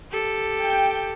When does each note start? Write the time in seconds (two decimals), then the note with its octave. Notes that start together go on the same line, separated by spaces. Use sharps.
0.11 G4 A4
0.61 G5